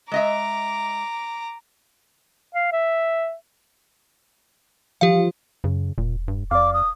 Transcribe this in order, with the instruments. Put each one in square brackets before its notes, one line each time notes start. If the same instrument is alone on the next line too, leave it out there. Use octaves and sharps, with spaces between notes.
[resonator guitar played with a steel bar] G#3 D#5 E5 [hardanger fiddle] A#5 D6
[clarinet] F5
E5
[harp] F3 [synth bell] G4 F5
[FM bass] F#2 [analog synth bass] C#3
[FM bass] E1 [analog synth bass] A#2
[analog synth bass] G2
[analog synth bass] F2 [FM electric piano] D5 F5 [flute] D6
[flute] D#6